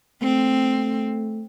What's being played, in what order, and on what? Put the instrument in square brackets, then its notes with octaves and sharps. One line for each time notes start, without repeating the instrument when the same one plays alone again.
[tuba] A3 [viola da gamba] C4